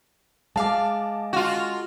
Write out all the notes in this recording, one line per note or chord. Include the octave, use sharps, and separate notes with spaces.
G#3 F5 A5 D6
F4 F#4